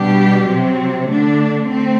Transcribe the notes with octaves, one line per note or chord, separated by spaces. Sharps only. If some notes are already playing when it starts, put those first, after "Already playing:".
Already playing: B2 G3 D4 G4
C3 F#3 C4
D3 A3 D4
A3 C4